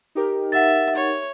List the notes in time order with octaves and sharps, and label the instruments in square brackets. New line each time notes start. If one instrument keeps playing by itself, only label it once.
[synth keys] D#4 G4 A#4
[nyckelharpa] E5 [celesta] F#5 A6
[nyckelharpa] C#5